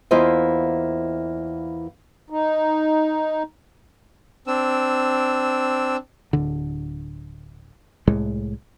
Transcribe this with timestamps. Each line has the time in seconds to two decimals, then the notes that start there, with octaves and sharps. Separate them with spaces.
0.11 E2 A#3 E4 F4 C5 D#5
2.30 D#4
4.47 C4 D4 E6
6.33 D1 D3
8.07 C2 A2 G#3